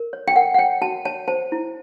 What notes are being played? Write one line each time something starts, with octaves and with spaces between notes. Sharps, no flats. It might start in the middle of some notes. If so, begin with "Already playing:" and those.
Already playing: A#4
C#5
G5
A#4 F#5
F#5
C#5 G5
F#4 A5
C#5 A5
C5 A5
E4